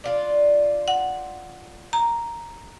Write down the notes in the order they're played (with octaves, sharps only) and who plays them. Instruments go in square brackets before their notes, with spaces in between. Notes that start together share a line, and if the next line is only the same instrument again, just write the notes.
[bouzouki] D4 F4 D5
[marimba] F#5
A#5